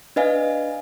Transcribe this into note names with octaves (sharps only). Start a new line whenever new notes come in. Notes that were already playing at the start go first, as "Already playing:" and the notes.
D4 B4 D#5 F5 G#5